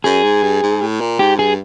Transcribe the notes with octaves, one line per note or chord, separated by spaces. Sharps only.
F#2 G#4
G#2
G2
G#2
A2
A#2
G#2 G4
G2 G#4